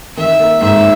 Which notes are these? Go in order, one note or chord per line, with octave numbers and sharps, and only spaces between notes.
D#3 E5
A#3
G#2 E5